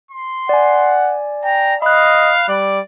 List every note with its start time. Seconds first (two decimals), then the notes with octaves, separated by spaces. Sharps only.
0.11 C6
0.49 D5 F#5 G#5
1.45 G5 A#5
1.82 D#5 F5 B5 F#6
2.48 G3 D5